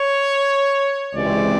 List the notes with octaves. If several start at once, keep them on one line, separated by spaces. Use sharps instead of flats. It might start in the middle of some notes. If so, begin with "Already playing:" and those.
Already playing: C#5
C#2 C3 E3 G#3 C4 D5